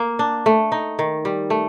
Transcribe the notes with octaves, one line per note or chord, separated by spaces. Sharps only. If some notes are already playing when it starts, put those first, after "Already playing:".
Already playing: A#3
D4
A3
D#4
D#3
G3
A3